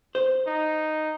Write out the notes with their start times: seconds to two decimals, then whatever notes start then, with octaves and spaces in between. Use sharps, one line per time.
0.15 C5
0.47 D#4